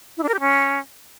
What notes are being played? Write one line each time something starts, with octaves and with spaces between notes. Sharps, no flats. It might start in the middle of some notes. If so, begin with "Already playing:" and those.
E4
D4
A#4
G4
C#4